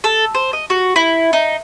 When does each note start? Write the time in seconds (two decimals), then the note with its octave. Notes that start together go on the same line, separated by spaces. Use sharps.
0.04 A4
0.34 C5
0.53 D#5
0.70 F#4
0.96 E4
1.33 D#4